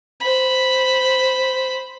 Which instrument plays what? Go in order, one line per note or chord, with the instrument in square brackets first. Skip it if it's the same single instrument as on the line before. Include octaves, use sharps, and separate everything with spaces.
[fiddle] C5 B5